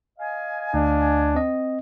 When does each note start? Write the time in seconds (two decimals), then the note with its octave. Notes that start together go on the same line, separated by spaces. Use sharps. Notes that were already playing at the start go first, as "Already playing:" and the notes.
0.19 D#5 F5 G#5
0.74 D2 D4
1.35 C4 D#5